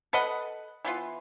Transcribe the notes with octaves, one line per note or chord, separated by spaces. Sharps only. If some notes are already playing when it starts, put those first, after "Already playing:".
A4 B4 D#5 F#5
E3 B3 F4